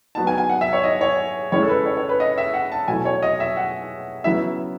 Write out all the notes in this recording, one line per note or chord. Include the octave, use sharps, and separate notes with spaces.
F#3 B3 D#4 A5
G#5
G#5
F#5
E5
C#5
D#5
C#5
C#3 G#3 C#4 E4 C#5
A4
B4
C#5
C#5
B4
D#5
E5
F#5
A5
B2 F#3 A3 E4 G#5
C#5
D#5
E5
F#5
C#3 F#3 B3 E4 E5